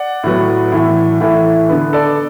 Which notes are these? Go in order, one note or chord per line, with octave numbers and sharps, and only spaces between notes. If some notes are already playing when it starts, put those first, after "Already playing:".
Already playing: D5 F#5
A2 F#3 B3
A2 E3 A3
A2 E3 A3
D3 B3
A4 D5